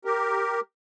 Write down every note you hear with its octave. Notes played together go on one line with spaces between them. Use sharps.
G4 A#4